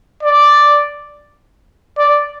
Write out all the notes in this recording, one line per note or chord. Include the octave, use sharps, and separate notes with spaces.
D5
D5